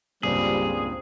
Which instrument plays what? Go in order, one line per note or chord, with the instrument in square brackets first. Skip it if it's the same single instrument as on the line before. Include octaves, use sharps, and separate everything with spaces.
[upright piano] C#2 G2 A#2 [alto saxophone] G3 [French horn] C4 [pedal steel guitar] G#4